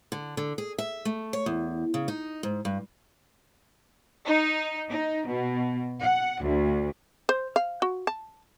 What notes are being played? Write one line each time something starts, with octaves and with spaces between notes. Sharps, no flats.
D3
D3
G#4
E5
A3
C#5
E2
C#3
D#4
G#2
G2
D#4
D#4
B2
F#5
D2
C5
F5
F#4
A5